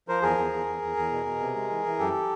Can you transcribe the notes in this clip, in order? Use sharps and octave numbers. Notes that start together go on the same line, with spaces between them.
F3 A#4 C5
E2 G#4 A#4
E2
E2
E2
E2
E2
B2
B2
C3
G#3
E3
E3
F#2 G4 A4